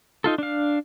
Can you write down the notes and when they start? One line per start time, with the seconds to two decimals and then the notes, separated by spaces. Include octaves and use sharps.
0.24 D#4 F4 A4
0.38 D4 F5